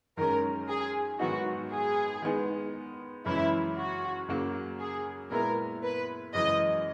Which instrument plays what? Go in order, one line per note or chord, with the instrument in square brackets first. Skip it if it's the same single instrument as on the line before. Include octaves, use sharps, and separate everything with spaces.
[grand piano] F#2 D#3 G#3 C#4 [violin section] A#4
[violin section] G#4
[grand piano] G#2 D#3 F#3 B3 D#4 [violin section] F#4
[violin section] G#4
[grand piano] D#3 G#3 B3 D#4
[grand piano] F#2 C#3 E3 G#3 C#4 [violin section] E4
[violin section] F#4
[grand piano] F#2 C#3 F#3 A#3
[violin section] G#4
[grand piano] A#2 G#3 B3 E4 [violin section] A#4
[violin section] B4
[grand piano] F#2 C#3 E3 G#3 [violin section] D#5